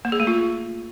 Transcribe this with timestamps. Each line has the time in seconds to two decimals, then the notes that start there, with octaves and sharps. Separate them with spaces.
0.05 A#3
0.12 G#4
0.20 A3
0.27 F4